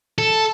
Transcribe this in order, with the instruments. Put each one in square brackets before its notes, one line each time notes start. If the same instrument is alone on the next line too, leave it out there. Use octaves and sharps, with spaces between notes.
[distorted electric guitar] A4